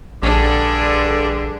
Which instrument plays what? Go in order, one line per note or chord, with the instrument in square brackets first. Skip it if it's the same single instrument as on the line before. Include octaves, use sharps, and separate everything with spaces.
[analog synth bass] A#1 [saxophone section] G2 D3 [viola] D4 G#4